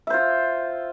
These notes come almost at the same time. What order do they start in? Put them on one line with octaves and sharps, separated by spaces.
E5 C5 F4